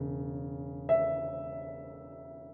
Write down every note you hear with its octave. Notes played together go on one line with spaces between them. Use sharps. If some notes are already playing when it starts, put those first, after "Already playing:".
Already playing: E1 C#3
E5